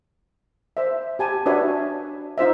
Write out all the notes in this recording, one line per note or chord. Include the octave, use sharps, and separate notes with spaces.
C5 E5
G4 G#5 A5
D4 F#4 B4 C#5 E5
D#4 F4 C5 E5